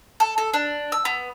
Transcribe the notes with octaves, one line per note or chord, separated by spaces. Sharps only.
A4
A4
D4
E6
B3